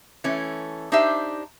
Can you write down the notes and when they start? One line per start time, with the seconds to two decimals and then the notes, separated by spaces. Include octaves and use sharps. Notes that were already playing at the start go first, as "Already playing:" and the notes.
0.24 E3 A3 C#4
0.92 D4 D#4 G4 C5 E5